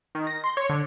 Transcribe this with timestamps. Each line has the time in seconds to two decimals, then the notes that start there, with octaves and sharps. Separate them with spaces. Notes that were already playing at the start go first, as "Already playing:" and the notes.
0.15 D#3
0.27 A#6
0.44 C6
0.57 C#5
0.69 D3